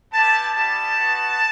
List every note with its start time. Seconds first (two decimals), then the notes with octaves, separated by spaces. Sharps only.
0.13 B3 E4 G4 A5
0.55 G3 B3 E4 G4 A5
0.97 B3 D#4 F#4